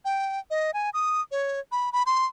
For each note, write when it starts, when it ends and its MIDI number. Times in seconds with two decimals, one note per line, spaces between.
0.05 0.39 79
0.50 0.71 75
0.74 0.90 80
0.94 1.21 87
1.31 1.60 73
1.72 1.92 83
1.93 2.03 83
2.06 2.26 84